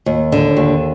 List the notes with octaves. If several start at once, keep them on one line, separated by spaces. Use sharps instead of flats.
D#2
D3
D#2